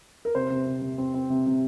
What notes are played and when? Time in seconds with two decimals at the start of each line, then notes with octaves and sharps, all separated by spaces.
0.25 A#4
0.35 C3 C5
0.50 C3
0.66 C3
0.82 C3
0.98 C4
1.14 C4
1.30 C3
1.46 C3